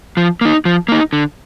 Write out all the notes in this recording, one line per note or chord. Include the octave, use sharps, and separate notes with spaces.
F3
A#3 D#4
F3
A#3 D#4
D3